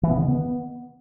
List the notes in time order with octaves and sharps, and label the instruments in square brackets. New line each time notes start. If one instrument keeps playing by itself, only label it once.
[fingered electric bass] E3
B3
C#3
D#3
B3